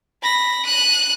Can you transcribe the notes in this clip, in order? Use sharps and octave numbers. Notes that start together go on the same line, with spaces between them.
B5 A#6
F#6 D#7